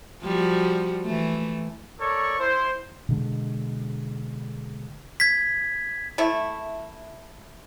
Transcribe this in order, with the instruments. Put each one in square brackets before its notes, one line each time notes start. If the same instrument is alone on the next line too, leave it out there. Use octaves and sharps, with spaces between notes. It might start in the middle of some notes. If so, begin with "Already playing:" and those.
[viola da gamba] F3 G3 F#4
E3 A3
[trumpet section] A4 A#4 C#5 D5 C#6
E4 C5
[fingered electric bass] B2 D3 G#3
[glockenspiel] G#6 B6
[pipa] A3 E4